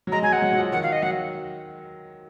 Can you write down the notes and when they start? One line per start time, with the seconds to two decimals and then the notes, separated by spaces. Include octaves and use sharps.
0.07 F#3
0.12 G#3 A#5
0.23 F#3 G#5
0.32 G#3 F#5
0.42 F#3
0.53 F#3
0.58 F3
0.72 D#3 F#5
0.83 F5
0.92 D#5
1.03 F#3 F#5